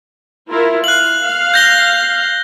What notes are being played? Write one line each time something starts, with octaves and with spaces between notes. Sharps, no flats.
E4 F4 A#4
F5 F#6 F#7
F5
G6 A#6 G7